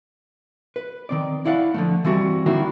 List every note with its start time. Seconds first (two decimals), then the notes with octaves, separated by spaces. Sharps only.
0.76 B4
1.09 D#3 C4 D5
1.45 E4 D5 F5 F#5
1.74 D3 F3 A3
2.05 E3 G3 C4 F#4
2.46 D3 D#3 A#3 D4 E4 F#4